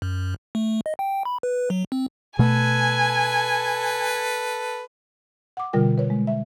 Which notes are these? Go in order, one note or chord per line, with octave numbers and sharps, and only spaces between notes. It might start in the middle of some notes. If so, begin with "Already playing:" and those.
F#2
A3
D#5
G5
B5
B4
F#3
C4
B2 A3 A4 B4 G#5
F#5 D6
B2 D3 G3 F4 A#4 G5
B4 C#5
G#3
E5